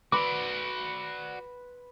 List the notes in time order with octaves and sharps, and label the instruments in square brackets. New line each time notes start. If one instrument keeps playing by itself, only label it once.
[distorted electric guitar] F#4 D5 [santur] B4 C6 [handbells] D6